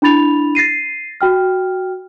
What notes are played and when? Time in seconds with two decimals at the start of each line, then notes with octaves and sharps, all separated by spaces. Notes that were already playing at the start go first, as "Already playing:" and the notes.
0.02 D4 E4 B5 A6 F7
0.55 A6 A#6 C7 D#7
1.21 F#4 G5 F6